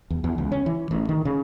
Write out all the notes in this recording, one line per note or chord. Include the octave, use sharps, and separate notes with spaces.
E2
E2
C#2
C#4
E3
A1
D#3
C#3